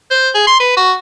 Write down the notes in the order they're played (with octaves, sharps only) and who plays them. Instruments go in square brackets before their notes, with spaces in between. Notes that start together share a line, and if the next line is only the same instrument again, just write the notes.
[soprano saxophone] C5
G#4
C6
B4
F#4